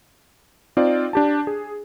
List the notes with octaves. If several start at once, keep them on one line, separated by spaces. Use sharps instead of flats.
C4 D#4 F4 D5
D4 G4 A5
G#4